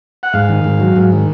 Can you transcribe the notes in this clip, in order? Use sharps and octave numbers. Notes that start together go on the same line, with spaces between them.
F#5
G#2 F5
D#3
G#2
F#3
G#2
D#3